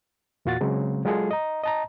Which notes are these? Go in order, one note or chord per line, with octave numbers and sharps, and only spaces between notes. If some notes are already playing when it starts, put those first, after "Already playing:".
E2 A#2 F4 F#4 F#5 A6
C#3 F#3 G#3 C4
F#3 G#3 F4 G#4 A4
D#5 A#5
D#5 A5 A#5